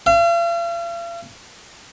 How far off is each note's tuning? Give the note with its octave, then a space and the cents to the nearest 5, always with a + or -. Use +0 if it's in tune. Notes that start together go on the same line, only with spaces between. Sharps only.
F5 -45